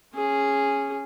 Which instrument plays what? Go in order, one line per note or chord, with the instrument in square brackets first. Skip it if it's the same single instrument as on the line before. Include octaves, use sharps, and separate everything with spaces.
[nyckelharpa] C#4 G#4